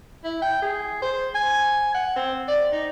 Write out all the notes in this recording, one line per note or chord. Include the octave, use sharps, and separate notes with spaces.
E4
G5
G#4
C5
G#5
F#5
C4
D5
D#4